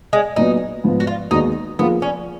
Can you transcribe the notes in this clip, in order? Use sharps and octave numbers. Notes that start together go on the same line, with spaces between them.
G#3
A#2 F#3 B3 D#4
G#2 F3 B3
F#4
F4
D#2 D#3 G#3 B3 D#4 F#4
F3 A#3 B3 F4 G#4
C#4